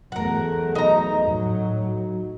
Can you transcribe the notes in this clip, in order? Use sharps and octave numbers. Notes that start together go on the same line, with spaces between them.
E2 F#3 A3 A#4 F#5
D#4 A#5
A2 F#3